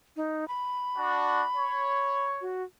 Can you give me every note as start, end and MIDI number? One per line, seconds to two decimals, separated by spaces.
0.16 0.47 63
0.48 2.26 83
0.97 1.43 62
0.97 1.43 66
1.56 2.52 73
2.41 2.63 66